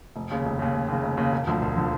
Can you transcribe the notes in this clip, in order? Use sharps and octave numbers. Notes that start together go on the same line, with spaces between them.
F1
D#2 C#3
F1
D#2 C#3
F1
D#2 C#3
F1
D#2 C#3
E1
D2 D3 F3
E1
D3 F3